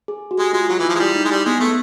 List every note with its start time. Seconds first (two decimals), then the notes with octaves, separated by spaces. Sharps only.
0.08 G#4
0.31 F#4
0.38 G#3 G4
0.53 G#3 F4
0.69 F#3 F4
0.79 E3
0.85 F3 E4
0.95 G#3
1.00 G3 E4
1.15 D#4
1.25 G#3
1.31 G3
1.45 G#3 B3
1.60 A3 B3